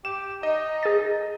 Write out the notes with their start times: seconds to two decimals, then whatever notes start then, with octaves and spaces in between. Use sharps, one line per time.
0.05 G4 E7
0.43 D#4 D#5
0.83 G#4 A6